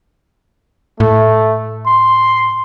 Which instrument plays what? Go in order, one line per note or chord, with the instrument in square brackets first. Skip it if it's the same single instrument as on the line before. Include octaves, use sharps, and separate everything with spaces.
[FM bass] A2 [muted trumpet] A3
[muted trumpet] C6